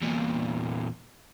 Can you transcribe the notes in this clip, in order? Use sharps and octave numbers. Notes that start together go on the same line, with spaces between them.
E2 A#2